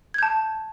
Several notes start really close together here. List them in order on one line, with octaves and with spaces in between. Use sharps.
G#6 G6 A5